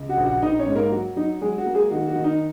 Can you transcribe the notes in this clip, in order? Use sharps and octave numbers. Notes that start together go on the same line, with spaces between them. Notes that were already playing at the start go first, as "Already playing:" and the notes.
Already playing: C#2
F#4 F#5
A#1
F#4 F#5
A#1 D#4 D#5
C#4 C#5
G#2
A#3 A#4
F#3 F#4
F#3 D#4
F#3 G#3 G#4
F#4
A#3
G#3 G#4
D#3 F#4
F#4
D#3
D#4